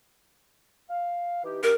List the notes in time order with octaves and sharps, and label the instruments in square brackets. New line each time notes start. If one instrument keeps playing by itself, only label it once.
[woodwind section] F5
E3 D#4 G4
[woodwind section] G2 G4 [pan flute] A#4